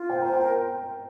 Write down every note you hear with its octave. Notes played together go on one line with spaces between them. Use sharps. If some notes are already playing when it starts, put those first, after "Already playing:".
Already playing: F4
C5 G5
C5 A#5
G5
A#4